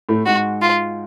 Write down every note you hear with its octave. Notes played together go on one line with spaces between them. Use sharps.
A2 A3
G#2 G#3 F#4
F4